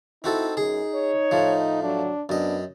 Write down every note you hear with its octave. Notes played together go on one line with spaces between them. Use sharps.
C4 D#4 E4 F#4 A4
F#2 G#4
C#5
A2 F3
F#3 D4
F#2 B3 D4 D#5